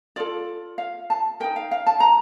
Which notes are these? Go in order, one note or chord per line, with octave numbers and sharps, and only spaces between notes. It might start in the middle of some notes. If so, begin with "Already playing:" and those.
F4 A4 D5
F5
A5
D#4 A#4 G5
F5
F5
A5
A#5